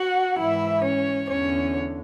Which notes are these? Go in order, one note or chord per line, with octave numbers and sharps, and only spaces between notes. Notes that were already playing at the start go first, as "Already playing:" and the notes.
Already playing: F#4 F#5
G#2 E3 E4 E5
C#4 C#5
E2 D3 C#4 C#5